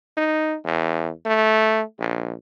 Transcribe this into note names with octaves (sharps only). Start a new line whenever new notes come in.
D#4
E2
A3
A#1